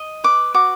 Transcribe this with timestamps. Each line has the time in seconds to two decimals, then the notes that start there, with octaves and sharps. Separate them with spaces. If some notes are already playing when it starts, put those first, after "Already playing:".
Already playing: D#5
0.24 B4 D6
0.54 F#4 D6